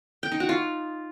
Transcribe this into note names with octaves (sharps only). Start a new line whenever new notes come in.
G5
D#4
F#4
F4